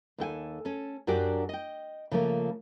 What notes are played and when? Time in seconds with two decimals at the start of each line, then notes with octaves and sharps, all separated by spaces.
0.18 D#2 A4 G5 G#5
0.65 C#4 A4
1.07 F#2 F#3 D4 F#4 G4 D5
1.49 D#5 G5
2.11 C#3 F3 A3 A#3